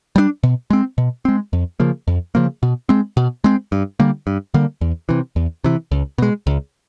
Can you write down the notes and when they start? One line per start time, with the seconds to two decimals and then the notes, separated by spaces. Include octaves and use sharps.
0.16 G3 B3 D4
0.43 B2
0.70 G#3 C4
0.98 B2
1.25 G#3 C4
1.53 F2
1.80 C#3 F3 A#3
2.08 F2
2.35 C#3 F3 A#3
2.63 B2
2.89 G#3 C4
3.17 B2
3.44 G#3 C4
3.72 G2
4.00 D3 G3 A#3
4.27 G2
4.54 D3 G3 A#3
4.81 E2
5.09 C3 E3
5.36 E2
5.64 C3 E3
5.91 C#2
6.18 B2 G#3
6.47 C#2